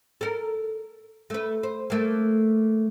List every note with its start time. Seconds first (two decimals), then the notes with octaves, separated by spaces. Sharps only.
0.21 A4 A#4
1.30 A3 B4
1.63 C5
1.90 A3 A#3